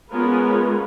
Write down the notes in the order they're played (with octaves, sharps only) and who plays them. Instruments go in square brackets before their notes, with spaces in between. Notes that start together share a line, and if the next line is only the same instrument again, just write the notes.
[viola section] G#3 B3 C#4 F4 A#4 B4